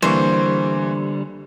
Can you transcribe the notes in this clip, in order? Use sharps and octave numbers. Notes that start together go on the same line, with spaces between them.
D3 E3 G3 A#3 C5 C#6